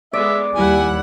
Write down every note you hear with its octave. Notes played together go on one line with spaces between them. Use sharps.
G#3 B3 D5 E5
D#2 G3 E4 F#5 G#5